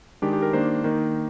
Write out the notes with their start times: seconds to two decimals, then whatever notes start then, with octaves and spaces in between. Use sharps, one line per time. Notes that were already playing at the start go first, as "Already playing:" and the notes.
0.22 D#3 G#3 D4 G4
0.33 G4
0.42 A#4
0.53 D#3 A#3 D4 C5
0.84 D#3 A#3 D#4